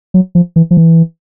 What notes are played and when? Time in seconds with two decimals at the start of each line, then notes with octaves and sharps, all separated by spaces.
0.14 F#3
0.35 F3
0.56 E3
0.71 F3
0.77 E3